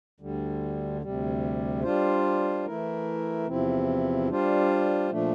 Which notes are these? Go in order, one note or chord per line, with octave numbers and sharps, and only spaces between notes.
D2 D3 G3
D2 C3 G3
G3 D4 F4 C5
E3 A3 E4 A#4
E2 C3 F3 C4 E4
G3 D4 F4 C5
A#2 F3 A3 D4